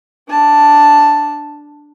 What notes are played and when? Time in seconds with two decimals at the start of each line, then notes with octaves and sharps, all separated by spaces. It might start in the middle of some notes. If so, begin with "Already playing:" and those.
0.28 D4 A5